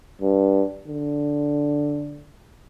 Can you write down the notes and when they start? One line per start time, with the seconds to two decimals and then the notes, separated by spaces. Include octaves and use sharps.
0.22 G2
0.88 D3